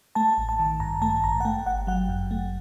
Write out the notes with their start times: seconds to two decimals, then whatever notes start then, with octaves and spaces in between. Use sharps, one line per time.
0.15 A3 A5
0.38 A1
0.49 A5
0.59 D#3
0.80 G2 A#5
1.02 A3 A5
1.23 A1 A#5
1.40 F#5
1.45 A3 G5
1.66 G1 F#5
1.87 F#3 F#5
2.09 F#2
2.31 A3